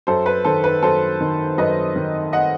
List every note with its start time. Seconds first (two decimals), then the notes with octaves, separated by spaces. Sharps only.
0.07 F#2 A4 C5
0.26 B4
0.45 D#3 A4 C5
0.64 B4
0.82 F#2 A4 C5
1.21 D#3
1.58 F#2 B4 D#5
1.96 D#3
2.33 D#5 F#5